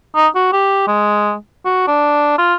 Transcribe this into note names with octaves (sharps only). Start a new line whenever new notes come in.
D#4
F#4
G4
G#3
F#4
D4
F4